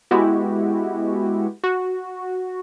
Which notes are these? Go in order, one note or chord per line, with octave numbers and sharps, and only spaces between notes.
G#3 B3 E4 F#4 G4
F#4